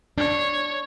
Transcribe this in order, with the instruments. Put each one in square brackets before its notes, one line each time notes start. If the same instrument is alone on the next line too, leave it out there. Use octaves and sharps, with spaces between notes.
[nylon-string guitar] D4 [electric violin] C#5